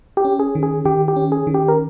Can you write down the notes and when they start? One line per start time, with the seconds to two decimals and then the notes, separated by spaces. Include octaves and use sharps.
0.17 G4
0.25 C#4
0.39 G#4
0.55 D#3
0.63 G#4
0.85 D#3 G4
1.08 G4
1.16 C#4
1.32 G#4
1.47 D#3
1.54 G4
1.68 A#4